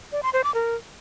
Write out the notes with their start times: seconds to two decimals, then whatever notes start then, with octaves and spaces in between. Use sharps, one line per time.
0.12 D5
0.23 C6
0.33 C5
0.44 D6
0.55 A#4